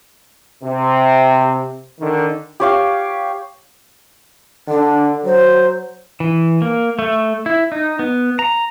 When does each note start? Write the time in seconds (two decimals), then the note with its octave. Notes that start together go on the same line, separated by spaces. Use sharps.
0.62 C3
1.99 D3 D#3
2.60 G4 C#5 F5
4.68 D3 D4
5.25 F#3 C5
6.20 E3
6.62 A#3
6.99 A3
7.46 E4
7.72 D#4
7.99 B3
8.39 A#5